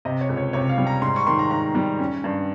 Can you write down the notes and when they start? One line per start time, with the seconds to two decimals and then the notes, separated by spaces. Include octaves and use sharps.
0.05 C3 D#5
0.21 C#5
0.29 C#2
0.37 C#5
0.53 C3 C#5
0.69 F5
0.78 G3
0.87 A#5
1.02 G#2 C6
1.16 C#6
1.26 D#3 C6
1.39 A#5
1.51 G#2 A#5
1.75 G3
1.99 C#4
2.24 G2